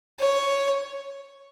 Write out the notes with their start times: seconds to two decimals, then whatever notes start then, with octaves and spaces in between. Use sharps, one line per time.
0.20 C#5